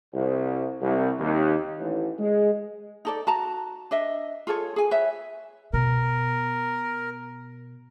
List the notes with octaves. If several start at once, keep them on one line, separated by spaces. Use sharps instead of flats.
C2
C2
D#2
A1
G#3
D#4 A4 D5
F#4 A5 A#5
D4 D#5 E5
F4 G#4 A4 C#5
G#4 G#5
B4 C#5 E5
B2 A#4